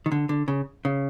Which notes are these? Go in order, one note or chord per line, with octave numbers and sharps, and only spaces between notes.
D#3
D3
D3
C#3
C#3